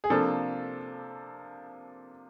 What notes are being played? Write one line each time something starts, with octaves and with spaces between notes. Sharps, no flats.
G#4
C3 F3 A#3 D4 A4